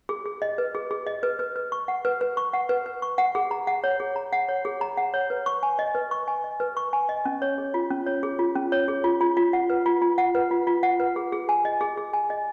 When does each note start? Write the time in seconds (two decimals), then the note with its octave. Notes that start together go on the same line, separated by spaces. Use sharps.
0.09 G#4
0.26 G#4
0.42 D#5
0.58 B4
0.75 G#4
0.91 G#4
1.07 D#5
1.23 B4
1.39 B4
1.56 B4
1.72 C#6
1.88 F#5
2.05 B4
2.21 B4
2.37 C#6
2.53 F#5
2.69 B4
2.86 B4
3.02 C#6
3.18 F#5
3.35 G#4
3.51 A#5
3.67 F#5
3.84 C#5
4.00 G#4
4.16 A#5
4.33 F#5
4.48 C#5
4.65 G#4
4.81 A#5
4.97 F#5
5.14 C#5
5.30 B4
5.46 C#6
5.63 G#5
5.79 D#5
5.95 B4
6.11 C#6
6.28 G#5
6.44 D#5
6.60 B4
6.77 C#6
6.93 G#5
7.09 D#5
7.25 C#4
7.42 C#5
7.58 G#4
7.74 F4
7.90 C#4
8.07 C#5
8.23 G#4
8.39 F4
8.55 C#4
8.72 C#5
8.88 G#4
9.04 F4
9.21 F4
9.37 F4
9.53 F#5
9.70 B4
9.86 F4
10.02 F4
10.18 F#5
10.35 B4
10.51 F4
10.67 F4
10.83 F#5
11.00 B4
11.16 G#4
11.32 G#4
11.49 G#5
11.65 D#5
11.81 G#4
11.97 G#4
12.13 G#5
12.30 D#5